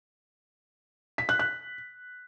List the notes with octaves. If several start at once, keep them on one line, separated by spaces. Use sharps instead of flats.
B6
F#6
F#6